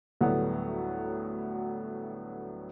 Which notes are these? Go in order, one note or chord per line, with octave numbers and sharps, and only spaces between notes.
D2 A2 D3 F#3 G3 B3